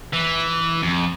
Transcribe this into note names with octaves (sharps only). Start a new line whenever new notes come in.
E3
F2